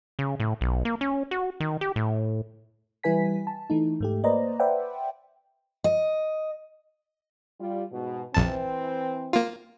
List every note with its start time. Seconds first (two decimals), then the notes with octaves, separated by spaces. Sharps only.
0.19 C#3
0.40 A2
0.61 B1
0.85 A#3
1.01 C#4
1.31 F#4
1.60 D#3
1.81 G4
1.96 A2
3.04 E3 G3 E4 B4 G#5 B6
3.47 A5
3.70 E3 A3 D#4
4.00 G#2 A3 G4
4.24 A#3 B4 C5 D5 D#5 A#5
4.60 B4 C5 D5 E5 F#5 G5
5.84 D#5
7.61 G3 F4
7.92 G#2 B2
8.34 A#1 F2 E3 C4 A5
9.33 A#3 F4